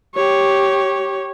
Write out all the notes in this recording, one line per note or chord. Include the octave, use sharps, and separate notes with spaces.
G4 C#5